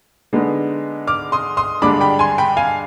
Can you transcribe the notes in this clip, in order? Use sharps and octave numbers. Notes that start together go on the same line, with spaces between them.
D3 G#3 B3 D#4
D6 F6
C6 D#6
C6 D#6
G2 D3 G#3 D4 B5 D6
G5 B5
G#5 C6
G5 B5
F5 G#5